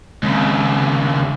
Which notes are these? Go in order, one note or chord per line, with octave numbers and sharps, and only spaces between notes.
D#2 C#3 G#3 C4